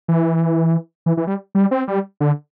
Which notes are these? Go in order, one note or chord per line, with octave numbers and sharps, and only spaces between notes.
E3
E3
E3
G3
G3
C4
G3
D3